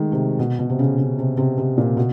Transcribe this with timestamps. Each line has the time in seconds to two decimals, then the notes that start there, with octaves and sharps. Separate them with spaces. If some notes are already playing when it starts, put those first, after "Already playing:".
Already playing: D#3 G#3 A3
0.12 C3
0.39 B2
0.59 B2
0.69 C3
0.79 C#3
0.98 C#3
1.19 C3
1.37 C3
1.58 C3
1.78 A#2
1.97 B2